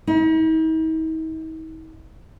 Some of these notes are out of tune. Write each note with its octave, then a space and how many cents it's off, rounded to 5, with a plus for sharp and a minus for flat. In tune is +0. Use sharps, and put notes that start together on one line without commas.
D#4 +45